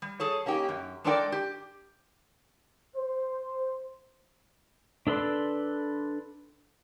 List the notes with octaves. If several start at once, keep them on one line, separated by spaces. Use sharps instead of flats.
G3
G#4 A4 C#5
A#3 C#4 D#4 G4
F#2
G#3 D4 A4 A#4 D5 G5
G4
C5
D4 A4 B4 C6